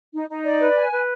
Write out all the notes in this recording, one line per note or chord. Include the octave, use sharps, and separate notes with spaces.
D#4
D#4
D5
B4
G#5
B4